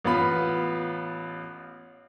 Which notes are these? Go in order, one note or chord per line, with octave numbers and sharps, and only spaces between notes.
A1 B3 F4 B5